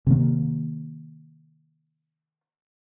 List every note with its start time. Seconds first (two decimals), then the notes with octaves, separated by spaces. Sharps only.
0.07 C3 D#3 A#3